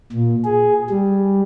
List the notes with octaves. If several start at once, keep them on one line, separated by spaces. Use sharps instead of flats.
A#2
G#4
G3